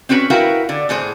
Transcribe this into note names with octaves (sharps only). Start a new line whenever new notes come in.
C4 C#4 F#4 A#4 B4
E4 F#4 A#4 B4 F5 G5
D3
A2 E3 G#4 C5